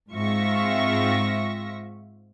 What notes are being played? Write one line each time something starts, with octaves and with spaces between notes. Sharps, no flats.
G#2 C4 F4 E5 C#6 A#6